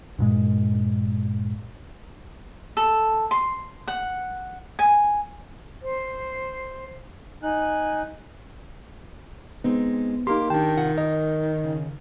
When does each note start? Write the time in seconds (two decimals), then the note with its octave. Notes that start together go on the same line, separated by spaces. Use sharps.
0.19 G2 A#2 G#3
2.77 A4
3.31 C6
3.88 F#5
4.79 G#5
5.82 C5
7.43 D#4 G#5 F#6
9.64 G#3 B3 C4 D#4
10.27 A#3 D#4 G4 C6
10.50 D#3 D4 G5 A5
10.77 C3 F4 F#5
10.98 A#4 D#5
11.64 C#3